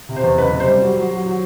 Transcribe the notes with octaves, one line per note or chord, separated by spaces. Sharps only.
C3
C5
E2
F#1 B4
C3
C5
G3
F#3
F#3
F#3
F#3